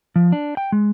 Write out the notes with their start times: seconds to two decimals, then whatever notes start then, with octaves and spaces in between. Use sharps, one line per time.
0.16 F3
0.32 D4
0.57 G5
0.72 G#3